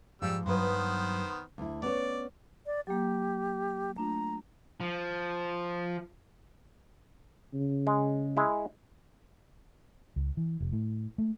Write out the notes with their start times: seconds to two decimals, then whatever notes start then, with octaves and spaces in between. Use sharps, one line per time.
0.22 G#2 F3 G3 E6
0.46 G2 D#3 F#3 B3 B4 C5
1.58 D2 E4
1.82 B3 C#4 C#5 D5
2.66 D5
2.87 F#3 A#3 G4
3.97 A3 D4 F4 A#5
4.80 F3
7.54 C#3
7.87 G#3
8.37 G#3 E4
10.16 C#2
10.37 E3
10.60 F1
10.73 A2
11.18 A3